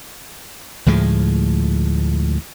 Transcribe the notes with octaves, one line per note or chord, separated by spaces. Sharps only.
D2 A2 F3 G#3